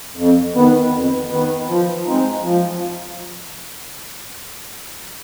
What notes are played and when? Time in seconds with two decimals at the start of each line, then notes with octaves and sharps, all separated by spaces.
0.17 F2
0.54 D#3 B3
0.92 F2
1.30 D#3 B3
1.68 F3
2.06 G#3 C4 D#4
2.43 F3